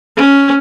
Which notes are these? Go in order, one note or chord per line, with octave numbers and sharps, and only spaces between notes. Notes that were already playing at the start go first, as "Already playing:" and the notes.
C#4